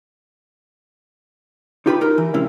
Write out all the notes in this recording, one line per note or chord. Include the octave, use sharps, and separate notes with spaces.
D#4 F4 G4 B4 B5
D#4 A#4 A#5
E3
C3 G#3 C#4 E4